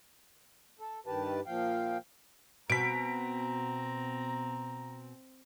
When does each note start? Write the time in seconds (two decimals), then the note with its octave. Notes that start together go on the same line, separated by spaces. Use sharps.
0.80 A4
1.06 G2 D#3 G4 B4 A5
1.46 A#2 F3 F5 G5
2.70 B2 C4 A#5 B6 D7